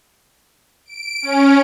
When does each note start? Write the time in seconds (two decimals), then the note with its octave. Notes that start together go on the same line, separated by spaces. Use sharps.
0.86 D7
1.22 C#4